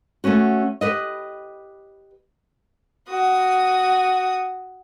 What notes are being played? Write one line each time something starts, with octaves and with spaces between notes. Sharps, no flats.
A3 B3 C#4 F#4
G4 B4 D#5
F#4 D#6